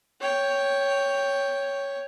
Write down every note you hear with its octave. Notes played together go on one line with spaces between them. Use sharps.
C#5 G5